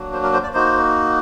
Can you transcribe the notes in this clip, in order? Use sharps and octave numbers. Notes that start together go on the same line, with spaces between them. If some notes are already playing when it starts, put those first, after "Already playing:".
Already playing: F#3 A#3 D4 F#4
C5
A#4
C5
D5
A#3 D#4 F#4 C5